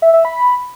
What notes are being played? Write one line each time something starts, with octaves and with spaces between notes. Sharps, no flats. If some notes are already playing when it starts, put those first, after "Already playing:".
E5
E5
B5